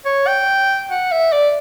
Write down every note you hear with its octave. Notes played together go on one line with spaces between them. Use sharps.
C#5
G5
F#5
E5
D5